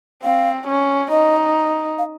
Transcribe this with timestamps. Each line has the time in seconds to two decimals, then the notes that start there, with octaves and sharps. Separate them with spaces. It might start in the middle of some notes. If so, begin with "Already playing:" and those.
0.24 C4 F5
0.67 C#4
1.10 D#4 D#5
1.98 F5